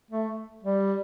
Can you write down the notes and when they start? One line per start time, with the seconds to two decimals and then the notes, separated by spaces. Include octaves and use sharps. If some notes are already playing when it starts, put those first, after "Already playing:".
0.10 A3
0.63 G3